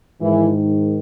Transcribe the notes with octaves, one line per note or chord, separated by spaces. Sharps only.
G#2 D#3 E3 E4